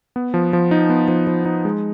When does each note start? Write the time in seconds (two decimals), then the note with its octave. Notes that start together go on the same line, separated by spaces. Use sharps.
0.16 B3
0.34 F3
0.53 F3
0.71 D#4
0.90 B3
1.08 F3
1.27 F3
1.45 D#4
1.65 G#3